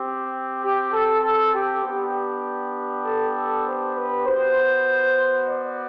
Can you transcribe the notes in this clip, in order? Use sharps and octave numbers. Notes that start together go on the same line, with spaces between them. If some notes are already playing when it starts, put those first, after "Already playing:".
Already playing: C4 G4
G4
A4
A4
G4
B3 D4 G4
A4
A4
C5
B4
B3 F#4 C5
D5